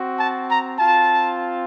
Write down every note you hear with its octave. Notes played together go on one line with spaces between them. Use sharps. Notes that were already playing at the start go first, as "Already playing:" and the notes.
Already playing: C4 F#4
A5
A#5
C4 F4 A5